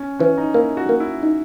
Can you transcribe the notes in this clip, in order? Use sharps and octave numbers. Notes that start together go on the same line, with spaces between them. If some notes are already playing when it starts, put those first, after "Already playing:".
Already playing: C#4
E3 C#4
D#4
A#3 E4
F#4
A#3
E4
D#4